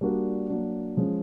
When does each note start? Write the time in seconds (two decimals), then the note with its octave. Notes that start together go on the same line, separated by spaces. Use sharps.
0.01 G3 A#3 D4 F#4 A#4
0.49 F#3 A#3 D4
0.97 F3 G#3 C#4